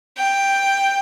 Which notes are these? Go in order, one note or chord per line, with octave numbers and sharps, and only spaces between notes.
G5